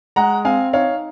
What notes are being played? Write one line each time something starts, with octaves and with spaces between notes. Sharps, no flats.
G#3 F#5 A#5
C4 F5 G#5
D#4 C#5 F5